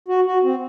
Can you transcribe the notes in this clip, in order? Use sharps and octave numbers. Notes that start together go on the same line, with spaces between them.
F#4
F#4
C4